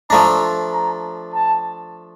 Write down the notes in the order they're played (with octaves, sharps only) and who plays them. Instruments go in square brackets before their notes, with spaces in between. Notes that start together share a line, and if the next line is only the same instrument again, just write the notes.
[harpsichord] F3 A3 D4 [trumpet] A#5
[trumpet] A#5
A5